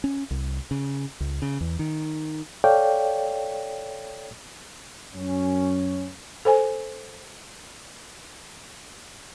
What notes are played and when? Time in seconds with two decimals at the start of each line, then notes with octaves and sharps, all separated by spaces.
0.04 C#4
0.31 C2
0.71 C#3
1.20 C#2
1.42 C#3
1.61 E2
1.79 D#3
2.64 A4 C#5 D5 F5 G5
5.14 F#2 C#4
6.45 A4 C5 G#5